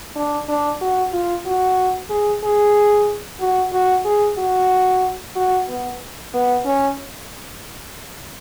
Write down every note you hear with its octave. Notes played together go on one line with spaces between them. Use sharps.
D4
D4
F#4
F4
F#4
G#4
G#4
F#4
F#4
G#4
F#4
F#4
B3
B3
C#4